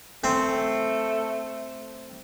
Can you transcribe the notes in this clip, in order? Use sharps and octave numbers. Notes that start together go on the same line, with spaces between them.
A3 C4